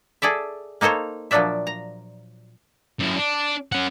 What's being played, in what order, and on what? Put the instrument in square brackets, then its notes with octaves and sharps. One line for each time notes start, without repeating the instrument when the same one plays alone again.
[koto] G#4 A4 D5 E5
A#3 D#4 A4 C5 C#5
A#2 F3 F#3 D4 D5 E5
A#5
[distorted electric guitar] F#2 E4
D4
C#4 F#5